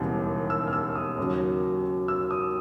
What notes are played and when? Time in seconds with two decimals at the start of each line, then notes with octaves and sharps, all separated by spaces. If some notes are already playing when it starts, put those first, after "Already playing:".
Already playing: E1 D#2 C#3 E3 G3
0.50 E6
0.67 F6
0.73 E6
0.95 D#6
1.17 D#2 C#3 F#3
2.08 E6
2.31 D#6